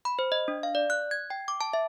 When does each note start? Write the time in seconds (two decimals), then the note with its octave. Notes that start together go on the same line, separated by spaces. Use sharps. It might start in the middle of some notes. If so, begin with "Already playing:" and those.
0.05 B5
0.19 C5
0.32 D#5
0.48 D4
0.63 F5
0.75 D5
0.90 F#6
1.11 G#6
1.30 G5
1.48 D6
1.61 A5
1.73 E5